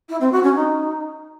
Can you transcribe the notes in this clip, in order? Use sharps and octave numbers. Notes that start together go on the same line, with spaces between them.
E4
C4
F#4
C#4
D#4